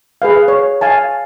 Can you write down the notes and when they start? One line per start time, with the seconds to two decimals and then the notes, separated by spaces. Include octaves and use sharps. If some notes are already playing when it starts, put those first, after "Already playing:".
0.22 G#4 B4 F5
0.48 C#5
0.81 F5 G#5 A5